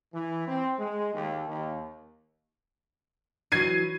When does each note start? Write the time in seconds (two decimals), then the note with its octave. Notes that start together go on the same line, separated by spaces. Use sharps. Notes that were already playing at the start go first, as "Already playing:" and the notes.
0.13 E3
0.46 C4
0.77 G#3
1.13 D#2
1.47 D#2
3.52 E3 F#3 G#6 C7 D#7